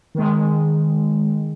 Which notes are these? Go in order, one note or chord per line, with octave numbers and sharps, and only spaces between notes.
D#3 G#3